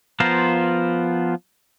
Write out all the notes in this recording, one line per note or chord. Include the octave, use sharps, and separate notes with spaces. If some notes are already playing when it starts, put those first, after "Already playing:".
F3 B3 F4 A#4 C5